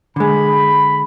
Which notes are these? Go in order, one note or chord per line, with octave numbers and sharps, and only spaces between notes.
D3 G#3 B5